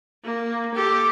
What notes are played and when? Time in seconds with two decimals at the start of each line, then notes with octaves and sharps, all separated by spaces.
0.24 A#3
0.74 G4 A4